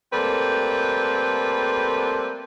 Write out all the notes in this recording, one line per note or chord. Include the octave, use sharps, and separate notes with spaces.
G3 A3 A#3 C4 A4 B4